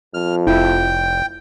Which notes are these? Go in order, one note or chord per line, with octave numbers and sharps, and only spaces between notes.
F2 F6
F1 E4 G5